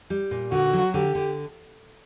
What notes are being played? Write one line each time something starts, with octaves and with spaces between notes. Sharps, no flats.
G3
A#2
D3 F#4
F#3
D3 G4
D3